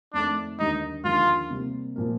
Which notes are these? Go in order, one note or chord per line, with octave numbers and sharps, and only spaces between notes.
F2 D#3 A3 D4
D#2 D3 G3 D#4
D#2 D3 F3 F4
C3 G3 A#3
A#2 F3 A#3